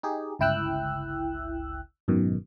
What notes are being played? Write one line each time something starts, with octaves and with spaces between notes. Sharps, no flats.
D#4 G4 G#4
G1 C#2 E4 G5 E6 F#6
G#1 F#2 B2 D#3